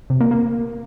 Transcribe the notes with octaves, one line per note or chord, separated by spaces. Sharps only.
C3
A#3
A#3